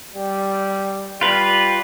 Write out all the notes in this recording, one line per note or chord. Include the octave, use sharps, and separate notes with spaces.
G3
G3 F4 B4